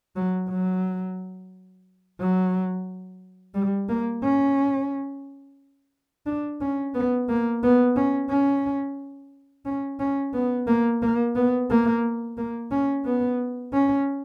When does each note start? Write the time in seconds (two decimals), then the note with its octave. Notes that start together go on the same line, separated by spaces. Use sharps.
0.16 F#3
0.49 F#3
2.19 F#3
3.54 G3
3.89 A#3
4.23 C#4
6.26 D4
6.61 C#4
6.94 B3
7.29 A#3
7.63 B3
7.96 C#4
8.30 C#4
9.65 C#4
10.00 C#4
10.33 B3
10.67 A#3
11.02 A#3
11.35 B3
11.70 A#3
12.37 A#3
12.72 C#4
13.05 B3
13.73 C#4